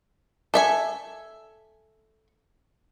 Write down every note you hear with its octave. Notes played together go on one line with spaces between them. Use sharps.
A4 E5 G#5